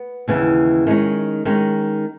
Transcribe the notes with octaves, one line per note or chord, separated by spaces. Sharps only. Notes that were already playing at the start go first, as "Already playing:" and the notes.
Already playing: B3
D#2 C#3 E3 B3
D#3 G#3 C#4
D#3 G#3 C#4